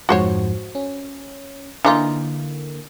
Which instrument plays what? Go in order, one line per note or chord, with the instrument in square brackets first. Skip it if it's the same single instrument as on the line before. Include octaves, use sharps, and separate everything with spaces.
[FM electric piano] F2 G#2 F3 [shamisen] F#4 C5 C#5
[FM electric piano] C#4
[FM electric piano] D3 A#3 [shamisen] E3 D#4 F4